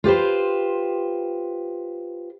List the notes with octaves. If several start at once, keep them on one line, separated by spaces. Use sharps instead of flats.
F4 G4 B4 C5